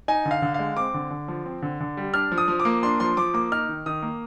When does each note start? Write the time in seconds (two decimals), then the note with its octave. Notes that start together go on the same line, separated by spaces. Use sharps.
0.08 D#4 G#5
0.25 D3
0.31 F5
0.42 D3
0.54 G#3 F5
0.77 C4 D6
0.94 D3
1.11 D3
1.28 F3
1.46 C4
1.62 D3
1.80 D3
1.97 G3
2.14 D4 F6
2.32 F3
2.38 D#6
2.48 F3
2.60 D6
2.65 A#3
2.83 D4 C6
3.00 F3 C6
3.17 F3 D6
3.34 A#3 D6
3.52 D#4 F6
3.69 D#3
3.86 D#3 D#6
4.02 A#3